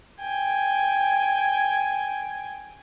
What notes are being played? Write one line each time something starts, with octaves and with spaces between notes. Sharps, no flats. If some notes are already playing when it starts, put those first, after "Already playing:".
G5 G#5